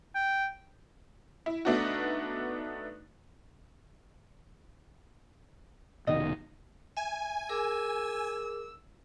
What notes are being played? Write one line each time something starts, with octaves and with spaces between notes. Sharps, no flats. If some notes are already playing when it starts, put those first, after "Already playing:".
G5
E4
A3 B3 D4 D#4 F#4
F1 B2 D#3 D#5
E5 G#5
G#4 A#4 D6 E6